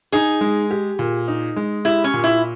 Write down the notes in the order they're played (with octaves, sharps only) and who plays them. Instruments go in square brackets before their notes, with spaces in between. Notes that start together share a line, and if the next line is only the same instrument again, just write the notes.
[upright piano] D#4 [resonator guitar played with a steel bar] G#4
[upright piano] G#3
G4
A#2
D#4
G#3
[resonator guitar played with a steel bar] E4 [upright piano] G4
[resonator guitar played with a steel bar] C#4
[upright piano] A#2
[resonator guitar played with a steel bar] E4